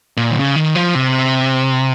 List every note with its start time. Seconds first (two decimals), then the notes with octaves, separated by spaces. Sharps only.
0.17 A#2
0.31 D#3
0.36 C#3
0.56 D#3
0.75 F3
0.95 C3